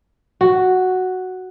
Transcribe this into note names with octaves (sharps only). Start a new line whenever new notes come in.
F#4